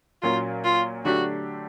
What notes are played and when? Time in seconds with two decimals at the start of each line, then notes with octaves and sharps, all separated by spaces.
0.22 A#2 F#3 A#3 C#4 F4
0.64 F4
1.05 D3 F#3 A3 D4 F#4 G4